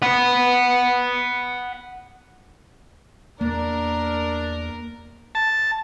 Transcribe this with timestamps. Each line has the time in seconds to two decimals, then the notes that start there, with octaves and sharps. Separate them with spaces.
0.03 F#5 B5
3.41 E2 A#3 D4 A#4
5.35 A5